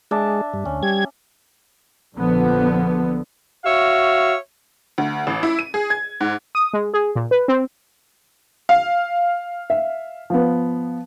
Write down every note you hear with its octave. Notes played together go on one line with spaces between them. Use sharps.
G#3 D4 E5 A5
G2
D2 C#4
G3 G#6
A#1 D3 F3 B3
F#4 C#5 E5 F5
D2
A1
E4
D#7
G#4
G#6
G#2
D#6
G#3
G#4
A#2
B4
C4
F5
E5
F3 B3